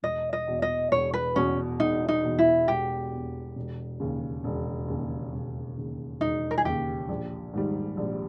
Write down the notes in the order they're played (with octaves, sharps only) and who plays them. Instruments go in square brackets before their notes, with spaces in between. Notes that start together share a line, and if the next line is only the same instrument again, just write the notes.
[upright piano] E1 [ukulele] D#5
[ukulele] D#5
[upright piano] E2 B2
[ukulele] D#5
[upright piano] E1 [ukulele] C#5
[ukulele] B4
[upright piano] E2 B2 [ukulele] C#4
[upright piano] E1 [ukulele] D#4
[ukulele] D#4
[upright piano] E2 B2
[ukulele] E4
[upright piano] E1 [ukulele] G4
[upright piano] E2 B2
E1
D#2 C#3
E1
D#2 C#3
E1
D#2 C#3
[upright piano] E1 [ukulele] D#4
[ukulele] A#4
G#4
[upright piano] D#2 C#3 [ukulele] G4
[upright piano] A#1
G#2 D#3 G3
A#1